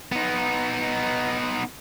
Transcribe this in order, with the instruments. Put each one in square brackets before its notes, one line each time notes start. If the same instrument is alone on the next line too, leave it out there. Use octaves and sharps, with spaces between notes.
[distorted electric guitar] B3 D#4